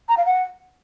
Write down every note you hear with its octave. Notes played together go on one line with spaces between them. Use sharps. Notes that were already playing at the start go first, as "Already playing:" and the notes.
A#5
F5
F#5